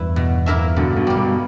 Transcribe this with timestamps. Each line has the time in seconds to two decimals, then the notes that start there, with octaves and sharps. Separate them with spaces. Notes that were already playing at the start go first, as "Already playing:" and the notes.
Already playing: E2 G2 E4 B4 E5
0.16 B2
0.46 A#3 E4 A#4 E5
0.76 G2 B2 D3
0.96 G2 B2
1.07 G3 A#3
1.17 G2 B2